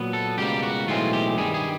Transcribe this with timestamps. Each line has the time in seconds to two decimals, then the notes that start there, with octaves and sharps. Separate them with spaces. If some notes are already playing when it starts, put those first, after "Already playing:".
Already playing: A#2 F#3 B3
0.13 A4
0.37 C#2 B2 G3 A#3 G4
0.63 F#4
0.88 B1 A2 E3 G#3 C4 F4
1.13 G4
1.38 G2 D#3 G3 G#4
1.54 G#4